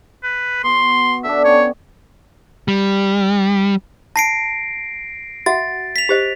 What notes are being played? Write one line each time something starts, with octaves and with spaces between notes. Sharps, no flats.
B4
B3 F#4 C6
D3 B3 D4 E5
C#4 C#5 G5
G3
A5 A#6 C7 D7
F#4 E5 F#5 A6
B6 F7
G4 C5 D#5